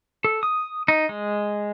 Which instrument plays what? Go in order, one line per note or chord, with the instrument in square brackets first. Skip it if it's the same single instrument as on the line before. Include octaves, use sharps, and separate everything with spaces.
[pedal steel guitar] A4
D#6
D#4
G#3